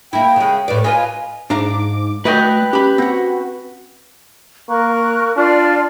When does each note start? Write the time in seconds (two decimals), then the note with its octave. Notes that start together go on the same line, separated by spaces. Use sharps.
0.13 A#3 E4 G5
0.36 C#3 G#3
0.68 A2 B4 D5
0.84 F4 B4 D#5 G#5
1.50 G#2 D4 F5 A#5 D6
2.25 A3 F#4 B4 D5 D#5 G5 F#6
2.73 C#4 G4 B5
2.98 C4 F#4 F#5
4.69 A#3 A#4 C#6 F#6
5.36 D4 F4 D5 F6